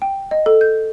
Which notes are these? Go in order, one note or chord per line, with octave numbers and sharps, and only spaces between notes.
G5
D#5
A4
G6